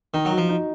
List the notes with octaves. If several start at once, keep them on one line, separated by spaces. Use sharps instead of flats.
D#3 D#4
F#3
F#4
F3
D#4